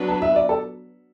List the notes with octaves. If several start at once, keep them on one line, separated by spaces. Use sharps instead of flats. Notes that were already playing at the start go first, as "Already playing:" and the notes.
Already playing: F#3 B3 D4 B4
A5
E5
D5
A4